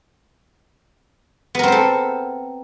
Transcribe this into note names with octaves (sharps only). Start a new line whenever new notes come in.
B3 C4 A4 A#4 C5